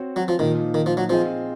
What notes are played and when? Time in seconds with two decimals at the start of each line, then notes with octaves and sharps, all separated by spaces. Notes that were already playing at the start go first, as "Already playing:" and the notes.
Already playing: C4 F#4 C#5
0.16 F#3
0.28 F3
0.39 A#2 D#3 F3 A#3 D#4
0.74 D#3
0.86 F3
0.97 F#3
1.10 F3 C4 F4 G#4 D#5